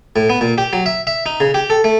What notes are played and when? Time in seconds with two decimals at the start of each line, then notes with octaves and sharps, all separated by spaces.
0.16 A2
0.29 B3
0.41 A#2
0.58 G4
0.73 F#3
0.86 E5
1.07 E5
1.26 D#4
1.40 C#3
1.54 G4
1.70 A4
1.84 A3